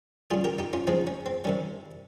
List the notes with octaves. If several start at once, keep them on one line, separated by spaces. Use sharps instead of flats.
C#3 G3 F4 G#4
G4 A#4
D#4 G4
C#4 F4
C#3 F3 G#3 C4 D#4
C#4
C4
C3 D#3 G3 C#4